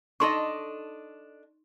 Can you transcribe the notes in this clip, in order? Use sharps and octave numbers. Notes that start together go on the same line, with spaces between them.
D4 D#4 A4 D#5 C6 C#6